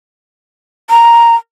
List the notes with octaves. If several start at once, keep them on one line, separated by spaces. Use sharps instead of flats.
A#5